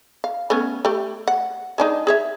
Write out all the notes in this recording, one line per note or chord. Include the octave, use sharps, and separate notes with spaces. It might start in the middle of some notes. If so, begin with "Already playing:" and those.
F5
A3 B3 C#4
A3 G4
F#5
G#3 D4 D#4
G#4 C#5 E5